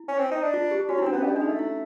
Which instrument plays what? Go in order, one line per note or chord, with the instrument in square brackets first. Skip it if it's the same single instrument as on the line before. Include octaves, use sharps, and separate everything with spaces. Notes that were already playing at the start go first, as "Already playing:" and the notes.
Already playing: [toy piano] E4
[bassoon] C#4
C4
D#4
D4
[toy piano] F4
G4
[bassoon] C#4 [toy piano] F#4
[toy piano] E4
[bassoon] C4
[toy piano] D4
[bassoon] B3 [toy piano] C#4
[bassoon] G3 [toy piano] D4
[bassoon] G#3 [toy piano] D4
[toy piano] D#4
[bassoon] A3
[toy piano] E4